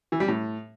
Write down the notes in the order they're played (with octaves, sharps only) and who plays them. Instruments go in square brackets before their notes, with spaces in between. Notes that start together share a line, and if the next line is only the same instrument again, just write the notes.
[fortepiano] E3
G3
A2